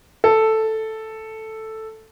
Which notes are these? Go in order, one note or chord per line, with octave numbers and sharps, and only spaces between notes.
A4